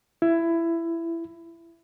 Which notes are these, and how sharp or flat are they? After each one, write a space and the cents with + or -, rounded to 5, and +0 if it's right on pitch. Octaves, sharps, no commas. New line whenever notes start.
E4 +15